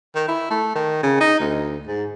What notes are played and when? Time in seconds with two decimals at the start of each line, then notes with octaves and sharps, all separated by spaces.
0.15 D#3
0.28 E4
0.50 A3
0.75 D#3
1.03 C#3
1.20 D#4
1.40 D2
1.87 G#2